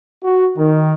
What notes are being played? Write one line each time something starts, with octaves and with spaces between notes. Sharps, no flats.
F#4
D#3